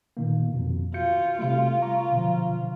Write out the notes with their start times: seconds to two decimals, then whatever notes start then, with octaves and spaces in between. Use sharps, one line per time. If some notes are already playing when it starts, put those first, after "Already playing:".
0.17 A#2 D#3 A#3
0.54 F2 B2
0.94 F4 F#4 G6 C#7
1.39 C3 G3 A3 F4
1.82 A#5 C#6
2.12 B2 D3 F3